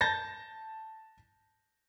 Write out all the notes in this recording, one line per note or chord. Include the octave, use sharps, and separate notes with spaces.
A5 G6 A6 A#6